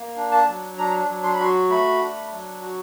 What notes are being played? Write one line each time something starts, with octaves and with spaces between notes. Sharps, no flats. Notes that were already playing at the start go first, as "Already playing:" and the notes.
Already playing: A#3
D4
A5
F#3
D4 A#5
F#3
C6
B5
F#4 C6
A3 B5
D4
F#3
F#4